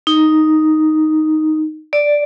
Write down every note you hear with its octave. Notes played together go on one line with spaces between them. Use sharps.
D#4
D5